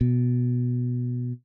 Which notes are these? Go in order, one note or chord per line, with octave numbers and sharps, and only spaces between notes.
B2